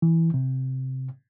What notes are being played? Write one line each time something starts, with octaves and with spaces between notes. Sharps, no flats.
E3
C3